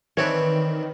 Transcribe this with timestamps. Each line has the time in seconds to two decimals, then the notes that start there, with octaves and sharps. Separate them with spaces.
0.17 D#3 E3 C4 D4 B4 C#5